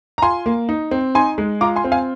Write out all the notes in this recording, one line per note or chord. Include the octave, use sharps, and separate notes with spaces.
A#5
F4 G#5 C6
A#3
D#4
C4
D#4 G#5 C6
G#3
F4 A#5 D6
G#5 C6
C4
F5 G#5